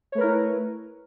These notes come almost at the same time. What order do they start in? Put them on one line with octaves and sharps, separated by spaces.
C#5 A3 B4 A#4 E4